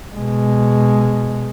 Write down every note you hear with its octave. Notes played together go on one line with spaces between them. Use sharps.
B2 G#3